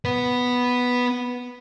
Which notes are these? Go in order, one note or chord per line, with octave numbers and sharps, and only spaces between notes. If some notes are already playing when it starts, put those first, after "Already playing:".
B3 B4